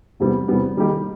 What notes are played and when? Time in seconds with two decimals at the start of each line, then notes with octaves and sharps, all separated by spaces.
0.20 E2 C3 E3 G3 B3
0.48 E2 C3 E3 G3 B3
0.77 D#3 G3 A#3 D#4 G4